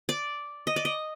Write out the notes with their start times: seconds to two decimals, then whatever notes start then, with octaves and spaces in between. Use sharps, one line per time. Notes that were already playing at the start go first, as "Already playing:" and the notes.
0.09 D5
0.67 D#5
0.76 D5
0.85 D#5